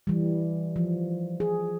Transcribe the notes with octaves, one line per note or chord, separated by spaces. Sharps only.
E3 G3
F3
G#4